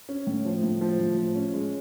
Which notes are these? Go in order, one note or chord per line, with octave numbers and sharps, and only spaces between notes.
C#4
A2
F3
A2
F3
A2
F3
C#4
G#3